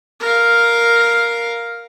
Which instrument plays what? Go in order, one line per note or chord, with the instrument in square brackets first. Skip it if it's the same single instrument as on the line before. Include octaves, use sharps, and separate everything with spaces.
[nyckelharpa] A#4 F5